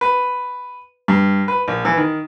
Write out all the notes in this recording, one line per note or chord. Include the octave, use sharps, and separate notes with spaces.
B4
G2
B4
A#1
E3
D#3